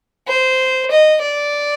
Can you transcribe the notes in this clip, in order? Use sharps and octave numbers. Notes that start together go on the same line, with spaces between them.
C5
D#5
D5